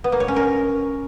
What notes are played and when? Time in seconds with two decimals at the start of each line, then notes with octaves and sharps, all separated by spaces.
0.04 B3
0.12 A#3
0.20 C#5
0.28 C#4
0.36 A#4